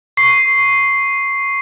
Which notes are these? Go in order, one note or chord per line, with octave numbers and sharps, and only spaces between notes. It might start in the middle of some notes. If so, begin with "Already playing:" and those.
C#6 C7